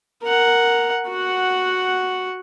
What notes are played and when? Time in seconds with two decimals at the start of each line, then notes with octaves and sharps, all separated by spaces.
0.23 A#4 F#5
1.08 F#4 F#5